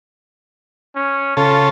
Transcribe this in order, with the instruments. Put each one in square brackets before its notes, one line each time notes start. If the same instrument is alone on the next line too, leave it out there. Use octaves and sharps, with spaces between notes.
[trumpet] C#4
[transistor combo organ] C#3 A4 [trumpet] F4